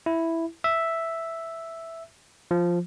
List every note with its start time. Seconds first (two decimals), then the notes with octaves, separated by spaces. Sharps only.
0.06 E4
0.64 E5
2.51 F3